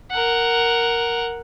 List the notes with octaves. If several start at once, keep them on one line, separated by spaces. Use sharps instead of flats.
A#4 F#5